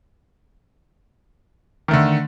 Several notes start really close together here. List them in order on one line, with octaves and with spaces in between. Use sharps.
D#3 A3 D3